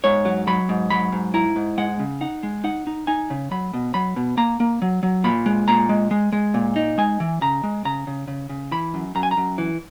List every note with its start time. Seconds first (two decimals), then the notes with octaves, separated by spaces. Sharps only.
0.04 G#2 C#5
0.25 F#3
0.47 F#3 B5
0.69 G#2
0.90 F#3 B5
1.12 G#2
1.34 E4 A#5
1.56 G#2
1.78 G#3 F#5
1.99 C#3
2.21 D#4 F#5
2.43 G#3
2.64 D#4 F#5
2.87 D#4
3.07 D#4 G#5
3.30 C#3
3.51 F#3 B5
3.74 B2
3.94 F#3 B5
4.16 B2
4.37 A#3 A#5
4.60 A#3
4.82 F#3
5.03 F#3
5.24 A#2 B5
5.46 G#3
5.68 A#2 A#5
5.89 G#3
6.11 G#3
6.32 G#3
6.54 A#2
6.76 D#4
6.98 G#3 G#5
7.20 E3
7.41 C#3 A#5
7.63 G#3
7.85 C#3 A#5
8.07 C#3
8.28 C#3
8.49 C#3
8.72 E3 B5
8.94 F#2
9.15 F#2 A#5
9.23 G#5
9.31 A#5
9.37 F#2
9.58 E3